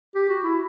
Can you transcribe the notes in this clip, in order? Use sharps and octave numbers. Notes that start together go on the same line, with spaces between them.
G4
F#4
E4